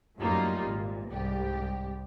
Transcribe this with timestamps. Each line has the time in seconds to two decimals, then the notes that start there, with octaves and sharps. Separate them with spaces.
0.19 F#2 A2 G3 A#3 D#4 F4
0.66 G#1 A#2
1.09 C2 G#2 G4